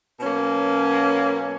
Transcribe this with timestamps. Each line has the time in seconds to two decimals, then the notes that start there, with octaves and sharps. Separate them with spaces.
0.20 B2 F#3 A#3 C#4